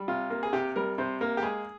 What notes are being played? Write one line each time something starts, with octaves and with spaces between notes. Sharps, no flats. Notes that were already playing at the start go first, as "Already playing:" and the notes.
Already playing: G3
C3 F4
A#3
G#4
C3 G4
G3 A#4
C3 C5
A#3 A#4
G4
G#3 G#4